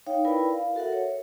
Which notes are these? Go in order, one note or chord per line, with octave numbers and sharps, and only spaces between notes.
D#4 C#5 F5 G5
E4 A#4 B4 D5 G5 B5
F5
F#4 A4 A#4 E5 F#5
C#5